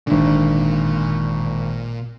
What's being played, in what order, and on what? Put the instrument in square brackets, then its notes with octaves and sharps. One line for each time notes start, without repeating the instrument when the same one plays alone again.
[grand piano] G#1 D3 [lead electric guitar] A#2